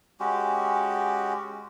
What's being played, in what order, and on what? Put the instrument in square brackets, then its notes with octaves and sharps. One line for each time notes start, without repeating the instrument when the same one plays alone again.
[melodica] G#3 C#4 F#4 G4